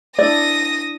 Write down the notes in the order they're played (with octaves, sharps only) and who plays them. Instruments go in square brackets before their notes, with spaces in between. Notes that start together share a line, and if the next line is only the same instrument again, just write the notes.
[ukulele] D4 E4 D5 [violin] D#6 A#6